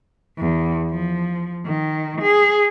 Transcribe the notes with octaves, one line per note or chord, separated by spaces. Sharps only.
E2
F3
D#3
G#4